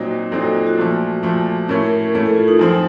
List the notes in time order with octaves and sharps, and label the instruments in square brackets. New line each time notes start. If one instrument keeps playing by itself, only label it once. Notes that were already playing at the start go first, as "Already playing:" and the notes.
Already playing: [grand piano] A#2 F#3 C4 D#4 [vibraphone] F#4
[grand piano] A#2 F#3 C4 D#4 [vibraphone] A4
[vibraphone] F#4
F4
F#4
[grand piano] A#2 F3 A3
A#2 F3 A3
[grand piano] A2 A3 C#4 [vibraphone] A#4
[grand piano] A2 A3 C#4 [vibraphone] A4
[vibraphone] A4
F4
D#4
[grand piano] F#2 F3 C4